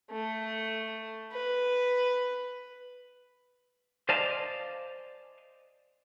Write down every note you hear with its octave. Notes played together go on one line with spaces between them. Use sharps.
A3
B4
C5 D5 D#5 F5 G#5 A5